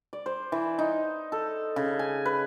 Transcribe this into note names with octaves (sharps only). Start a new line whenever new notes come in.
D5
C5
E3
D#4
A4
C#3
G#5
B4